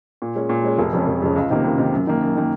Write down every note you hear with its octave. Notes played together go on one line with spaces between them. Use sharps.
A#2
G#3 C#4
A#2
G#3 C#4
F1
F2 C#3 G#3 C#4
F1
F2 C#3 G#3 C#4
C#2
C3 D#3 A#3
C#2
C3 D#3 A#3
F#2
D#3 A#3
F#2
D#3 A#3